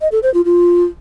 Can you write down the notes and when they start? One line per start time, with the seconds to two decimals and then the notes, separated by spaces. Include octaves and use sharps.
0.01 D#5
0.12 A4
0.23 C5
0.34 F4
0.45 F4